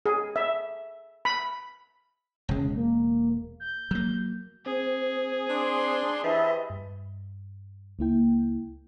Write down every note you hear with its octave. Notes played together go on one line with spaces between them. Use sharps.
G#4
E5
B5
E1 C#3 G#3
A#3
G6
F#3 A#3
C4 G#4
D4 C6
E3 G4 C5 D#5 E5 A5 B5
G2
C#2 A#3 E4 G5